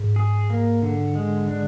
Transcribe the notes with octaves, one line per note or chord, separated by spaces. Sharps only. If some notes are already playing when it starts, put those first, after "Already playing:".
Already playing: G#2
G#4
A#3
D3
G#3
D4